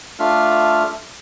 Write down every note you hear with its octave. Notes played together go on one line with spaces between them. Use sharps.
A3 D4 F4 E5 F5 F6